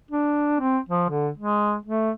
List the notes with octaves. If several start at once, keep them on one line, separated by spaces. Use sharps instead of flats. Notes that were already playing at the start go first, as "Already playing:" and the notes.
D4
C4
F3
D3
G#3
A3